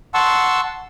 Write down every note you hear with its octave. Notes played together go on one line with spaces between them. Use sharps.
F#5 A5 C6 C#6 E6